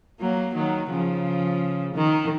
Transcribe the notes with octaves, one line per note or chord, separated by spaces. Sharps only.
F#3 A#3
D#3 F#3
C#3 F3
D#3